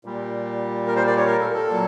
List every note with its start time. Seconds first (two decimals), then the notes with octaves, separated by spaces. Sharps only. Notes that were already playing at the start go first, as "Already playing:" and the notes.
0.05 A#2 G3
0.87 A#4
0.96 C5
1.07 D5
1.17 C#5
1.27 A#4
1.40 A4
1.54 A4
1.68 A#2 F#3